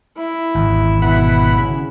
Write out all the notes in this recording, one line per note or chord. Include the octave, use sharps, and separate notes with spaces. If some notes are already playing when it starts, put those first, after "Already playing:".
E4
G#1 E2
B2 E4 F#5 B5
C#3